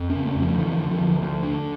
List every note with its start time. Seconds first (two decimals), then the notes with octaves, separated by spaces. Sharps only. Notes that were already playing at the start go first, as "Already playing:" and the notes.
Already playing: F2
0.10 C#4
0.15 C#3
0.26 A3
0.36 F2
0.42 F3
0.58 D3 E3
0.79 D3
0.90 F3
1.00 D2
1.22 D2
1.43 D3